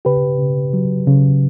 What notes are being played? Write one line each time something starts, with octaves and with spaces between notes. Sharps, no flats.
C#3 G4 B4
C#3
F#3
C#3